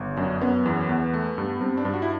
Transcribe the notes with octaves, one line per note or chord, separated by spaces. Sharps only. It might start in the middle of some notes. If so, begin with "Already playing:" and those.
Already playing: G1
F#2 D4
F#2 B3
E2
E2
A3
G2
G2 C4
D4
G2
F#4
E4